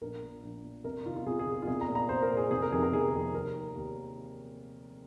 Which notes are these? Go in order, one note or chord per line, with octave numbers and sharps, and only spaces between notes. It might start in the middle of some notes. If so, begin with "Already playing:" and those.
A#1 A#4
A#2
A#1
A#2
C2 A#4
C3 D#3 F4
F4
C2 G#4
G#4
C3 D#3
F4
C2 G#4
A#5
A#2
A#5
C2 C5
A#4
A#2
G#4
F1 G#4
A#4
F2 C3 D#3 G#4
A#4
F1 G#4
F2 C3 D#3
D#2 A#4
D#3
D#2